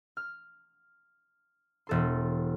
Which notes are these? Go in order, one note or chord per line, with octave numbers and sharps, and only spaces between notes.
F6
E1 A4 C6